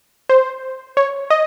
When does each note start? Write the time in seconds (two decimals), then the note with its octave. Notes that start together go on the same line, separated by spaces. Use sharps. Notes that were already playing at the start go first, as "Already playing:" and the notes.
0.29 C5
0.97 C#5
1.30 D#5